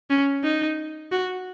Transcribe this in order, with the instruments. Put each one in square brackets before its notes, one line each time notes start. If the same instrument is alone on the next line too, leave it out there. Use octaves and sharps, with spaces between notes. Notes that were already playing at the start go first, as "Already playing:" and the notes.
[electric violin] C#4
D#4
F#4